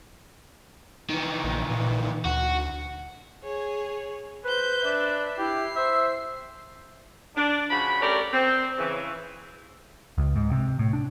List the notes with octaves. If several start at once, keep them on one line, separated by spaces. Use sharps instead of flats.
D#3 E3
A#1
A#2
D2 F#4
G#4 C#5
B4 C5 G6
D4 E5
E4 G4 C7
C5 E5
D4
C#3 F3 F#4 B5
A3 C#4 G4 A#4 D5
C4
C#3 E3
C#2
G#2
C3
A2
D4